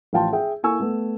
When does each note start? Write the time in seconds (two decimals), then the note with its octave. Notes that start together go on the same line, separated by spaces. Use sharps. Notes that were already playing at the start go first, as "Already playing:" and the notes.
0.13 A1 F3 F5 G5 A5 C6
0.32 G#4 E5 G5
0.63 A#3 E4 A4 G#5 C#6 E6
0.80 A3 B3